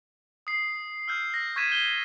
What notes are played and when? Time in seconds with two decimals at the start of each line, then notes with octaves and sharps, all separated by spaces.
0.47 D#6 C7
1.08 E6 F6 G6
1.34 A#6
1.56 C#6 G6 G#6 B6 D#7 E7
1.72 G6 G7